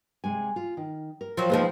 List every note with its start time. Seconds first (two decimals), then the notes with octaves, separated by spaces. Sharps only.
0.24 C3 G#3 G#5
0.56 F4
0.77 D#3
1.21 A#4
1.37 F3 F#3
1.50 F3 G#3 A#3 B3 D#4 A5